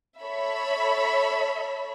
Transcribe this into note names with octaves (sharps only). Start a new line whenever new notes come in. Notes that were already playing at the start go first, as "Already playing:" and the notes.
A4 C#5 E5 B5